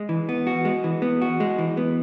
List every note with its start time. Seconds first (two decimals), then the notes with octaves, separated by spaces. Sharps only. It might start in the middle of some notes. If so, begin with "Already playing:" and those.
Already playing: G#3
0.09 E3
0.29 B3
0.47 F#4
0.65 G#3
0.84 E3
1.02 B3
1.22 F#4
1.40 G#3
1.58 E3
1.77 B3